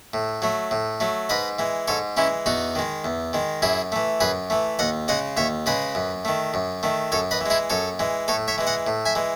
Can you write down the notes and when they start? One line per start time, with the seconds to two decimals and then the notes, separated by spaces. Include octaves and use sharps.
0.14 A2
0.42 F#3 A3
0.71 A2
1.00 F#3 A3
1.29 G#2 B4 D#5
1.59 E3 G#3
1.88 G#2 A4 C#5
2.17 E3 G#3 C#4 E4
2.46 E2 D#4 F#4
2.75 D#3 G#3
3.04 E2
3.33 D#3 G#3
3.62 F#2 E4 G#4
3.92 E3 A3
4.20 F#2 G#4 B4
4.50 E3 A3
4.79 D#2 D#5 F#5
5.08 C#3 G#3 D#5 F#5
5.37 D#2 C#5 E5
5.66 C#3 G#3 B4 D#5
5.95 F#2
6.25 D#3 A3
6.54 F#2
6.83 D#3 A3
7.12 F#2 A4 C#5
7.31 B4 D#5
7.41 E3
7.46 G#3 E4 G#4
7.70 F#2 A4 C#5
7.99 E3 G#3
8.28 A2 A4 C#5
8.48 C#5 E5
8.58 E3 G#3
8.67 D#5 F#5
8.87 A2
9.05 E5 G#5
9.15 E3 G#3